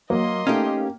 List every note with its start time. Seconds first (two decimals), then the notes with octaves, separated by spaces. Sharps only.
0.10 F#3 A#3 D#5 C6
0.47 A3 C#4 D#4 G4 F5